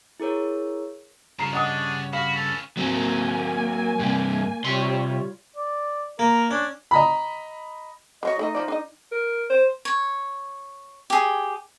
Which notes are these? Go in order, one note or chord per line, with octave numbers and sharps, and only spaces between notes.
E4 G#4 A#4 C#5
G2 C#3 F3 A#5 C7
D4 G#4 C#5 D#5 F#5 D#6
F#4 F5 B5
C#4 A4 B4
F#3 A#3 C4 G#5
G2 C3
C3 G3 F4 C#5 C6
D5
A#3 A#4
C#4 D4
D#5 A#5 B5
F#3 F4 C#5 D#5
A3 D#4 C#5 D#5
F3 D5
D4 D#5
A#4
C5
C#5
G4 G#4